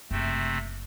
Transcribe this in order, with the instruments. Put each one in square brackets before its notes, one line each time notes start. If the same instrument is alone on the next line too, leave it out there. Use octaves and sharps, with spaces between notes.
[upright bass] F#1 [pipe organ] C3 A3 C4